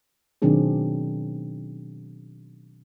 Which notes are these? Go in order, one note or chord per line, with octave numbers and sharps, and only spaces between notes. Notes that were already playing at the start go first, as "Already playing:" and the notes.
B2 D#3 F#3 C4 D4 G#4